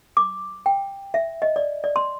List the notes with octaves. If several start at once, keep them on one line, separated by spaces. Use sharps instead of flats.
D6
G5
E5
D#5
D5
D5
C6